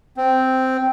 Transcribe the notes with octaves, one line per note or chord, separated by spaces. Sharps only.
C4